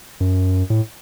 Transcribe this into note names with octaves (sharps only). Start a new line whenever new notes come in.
F#2
A2